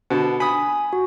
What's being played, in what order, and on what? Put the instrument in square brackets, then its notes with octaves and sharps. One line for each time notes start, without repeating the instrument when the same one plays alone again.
[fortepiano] B2 D3
[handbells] G#5 [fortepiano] B5 D#6
[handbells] F#4